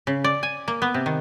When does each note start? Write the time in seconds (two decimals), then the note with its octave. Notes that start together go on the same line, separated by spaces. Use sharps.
0.07 C#3
0.24 D5
0.43 G#5
0.68 A#3
0.82 B3
0.94 C3
1.06 D#3